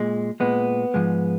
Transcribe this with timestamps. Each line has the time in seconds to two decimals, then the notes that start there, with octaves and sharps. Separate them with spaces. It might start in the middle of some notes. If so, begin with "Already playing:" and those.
Already playing: A#2 G#3
0.40 A#2 G#3 B3
0.94 G#2 F3 G#3